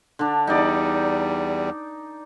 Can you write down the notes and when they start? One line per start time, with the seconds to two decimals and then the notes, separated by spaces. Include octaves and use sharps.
0.19 D3 D4
0.47 E2 G3 D#4 D5